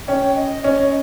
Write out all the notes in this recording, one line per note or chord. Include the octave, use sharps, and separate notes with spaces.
C#4 G5
D#5
C#4 D#5